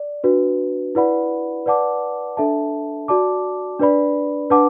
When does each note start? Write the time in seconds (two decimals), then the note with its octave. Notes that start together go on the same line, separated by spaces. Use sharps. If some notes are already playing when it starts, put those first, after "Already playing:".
Already playing: D5
0.24 D4 F#4 B4
0.95 E4 B4 D5 F#5 B5
1.66 B4 D5 F#5 A5 D6
2.37 D4 A4 E5 A5
3.08 F#4 D5 A5 D6
3.80 D4 B4 D5 B5
4.50 D4 B4 F#5 A5 D6